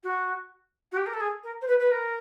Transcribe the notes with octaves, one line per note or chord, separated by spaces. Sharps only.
F#4
F#4
G4
A#4
A4
G#4
A#4
C5
B4
B4
A#4